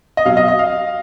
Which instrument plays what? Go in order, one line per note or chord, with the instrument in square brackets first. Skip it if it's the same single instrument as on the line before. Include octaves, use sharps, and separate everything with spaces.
[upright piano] D#5
B2 F#3 F5
D#5
D#5
F5